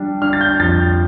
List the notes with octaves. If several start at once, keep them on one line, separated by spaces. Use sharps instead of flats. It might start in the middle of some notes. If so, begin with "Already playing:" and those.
Already playing: G3 D4
D4 F6
A6
G6
F2 A6